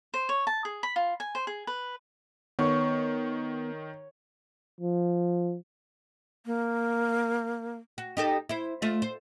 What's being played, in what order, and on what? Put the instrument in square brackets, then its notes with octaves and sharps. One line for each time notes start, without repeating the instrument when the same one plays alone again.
[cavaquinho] C5
C#5
A5
G#4
B5
F4
G#5
C5
G#4
B4
[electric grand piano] D#3 [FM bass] B3 [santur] C#5
[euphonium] F3
[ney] A#3
[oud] F#4
D#4 G4 A4
E4 C5
A3 F4
C5